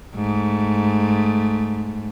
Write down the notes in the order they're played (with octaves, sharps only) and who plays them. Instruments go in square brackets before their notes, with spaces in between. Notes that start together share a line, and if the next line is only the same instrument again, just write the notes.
[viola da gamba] G#2 A3